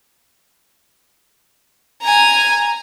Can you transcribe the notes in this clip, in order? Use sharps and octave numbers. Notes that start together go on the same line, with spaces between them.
G#5 A#5